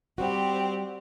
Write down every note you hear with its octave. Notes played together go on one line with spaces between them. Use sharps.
G3 C4 F#4 G4